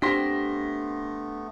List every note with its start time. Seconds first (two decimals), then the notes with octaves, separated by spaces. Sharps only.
0.02 A3 B3 C4 D4 G4 C6 A#6 B6